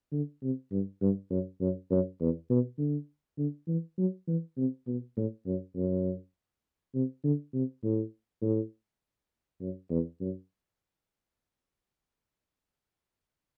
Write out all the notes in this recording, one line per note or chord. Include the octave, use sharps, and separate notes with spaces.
D3
C3
G2
G2
F#2
F#2
F#2
E2
B2
D3
D3
E3
F#3
E3
C3
B2
A2
F#2
F#2
C3
D3
C3
A2
A2
F#2
E2
F#2